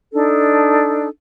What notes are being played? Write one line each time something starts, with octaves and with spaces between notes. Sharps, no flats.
D4 D#4 A4